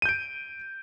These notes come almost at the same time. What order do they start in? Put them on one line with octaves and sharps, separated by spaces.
D#7 G6 D7